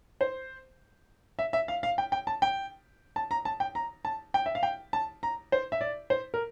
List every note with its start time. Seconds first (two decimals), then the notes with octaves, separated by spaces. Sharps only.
0.21 C5
1.39 E5
1.53 E5
1.68 F5
1.83 F5
1.98 G5
2.12 G5
2.27 A5
2.42 G5
3.16 A5
3.31 A#5
3.45 A5
3.60 G5
3.75 A#5
4.05 A5
4.34 G5
4.46 E5
4.55 F5
4.63 G5
4.93 A5
5.23 A#5
5.52 C5
5.72 E5
5.81 D5
6.10 C5
6.34 A#4